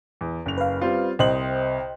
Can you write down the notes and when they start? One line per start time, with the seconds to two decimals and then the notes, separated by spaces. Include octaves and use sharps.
0.21 E2
0.46 F#1 F7
0.58 B4 F5
0.81 G3 C4 F4
1.19 C2 C5 D#5 G5 F#7